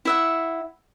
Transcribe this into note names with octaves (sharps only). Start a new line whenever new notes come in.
E4 E5 F#5